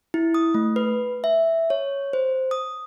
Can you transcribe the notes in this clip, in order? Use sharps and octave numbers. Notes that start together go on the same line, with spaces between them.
E4
D#6
A3
B4
E5
C#5
C5
D#6